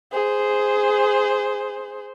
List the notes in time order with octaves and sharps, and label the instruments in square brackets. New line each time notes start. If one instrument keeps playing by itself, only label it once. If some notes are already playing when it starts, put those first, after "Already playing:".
[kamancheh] G#4 C5